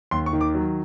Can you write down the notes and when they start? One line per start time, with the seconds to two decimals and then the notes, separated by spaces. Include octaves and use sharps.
0.11 D#2 C6
0.26 C#6
0.33 D#3
0.41 D6
0.54 F#3